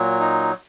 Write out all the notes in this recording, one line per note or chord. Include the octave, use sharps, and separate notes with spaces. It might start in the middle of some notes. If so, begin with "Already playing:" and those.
Already playing: A#2 F#3
D#4